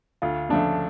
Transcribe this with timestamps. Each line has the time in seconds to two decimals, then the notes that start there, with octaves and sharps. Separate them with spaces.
0.22 D2 F4
0.49 C#3 F3 A3 D4